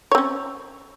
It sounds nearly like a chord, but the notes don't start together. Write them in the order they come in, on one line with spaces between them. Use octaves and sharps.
C#5 C4 C#4